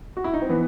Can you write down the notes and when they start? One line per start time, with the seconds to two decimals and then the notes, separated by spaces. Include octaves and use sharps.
0.17 F#4
0.24 E4
0.34 D#4
0.42 C4
0.49 E3 B3